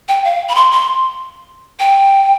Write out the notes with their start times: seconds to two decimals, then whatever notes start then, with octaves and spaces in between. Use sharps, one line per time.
0.09 G5
0.25 F5
0.49 B5
0.55 C6
0.72 C6
1.80 G5